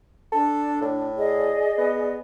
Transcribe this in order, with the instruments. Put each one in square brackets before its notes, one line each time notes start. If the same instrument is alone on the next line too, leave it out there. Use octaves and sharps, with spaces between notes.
[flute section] D4 [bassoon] A4
[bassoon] A2
[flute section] G#4 D5 D#5
[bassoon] B3